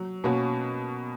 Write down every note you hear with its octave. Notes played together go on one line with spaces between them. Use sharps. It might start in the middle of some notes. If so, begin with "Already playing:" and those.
Already playing: F#3
B2 A#3 C#4 F#4